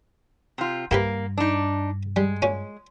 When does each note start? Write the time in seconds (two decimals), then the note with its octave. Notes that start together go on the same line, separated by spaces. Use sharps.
0.58 C3 F4
0.91 G2 A#3 E4 G4 B4
1.38 D4 D#4
2.16 G3 G#3
2.42 A#2 C#4